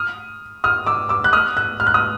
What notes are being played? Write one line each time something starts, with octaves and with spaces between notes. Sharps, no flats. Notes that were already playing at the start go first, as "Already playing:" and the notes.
Already playing: D#6 F6
D#6 F6
D6 E6
D6 E6
F#6
D#6 F6
E6 F#6
F6
F#6
D#6 F6